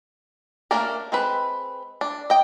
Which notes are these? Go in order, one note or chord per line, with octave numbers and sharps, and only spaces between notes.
A3 A#3 C#4 D4 A#4
G#3 C4 B4
D4
D#5 G5